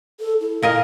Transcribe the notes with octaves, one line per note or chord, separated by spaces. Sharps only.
A4
E4
A#2 A#4 D#5 F5